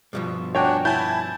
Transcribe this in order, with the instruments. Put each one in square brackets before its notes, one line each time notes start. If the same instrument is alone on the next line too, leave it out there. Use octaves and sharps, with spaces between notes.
[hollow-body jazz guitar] G2 B2 F3
[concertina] D4 F#4 [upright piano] C#5 G5 G#5
[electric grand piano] E4 G#5 [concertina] A5 [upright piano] G6